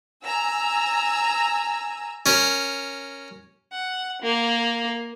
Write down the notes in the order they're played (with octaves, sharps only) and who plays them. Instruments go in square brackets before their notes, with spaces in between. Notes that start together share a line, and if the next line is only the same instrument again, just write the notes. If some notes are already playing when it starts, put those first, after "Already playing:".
[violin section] G#5 A#5 E6
[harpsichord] C#4 A#4
[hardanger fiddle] F#5
A#3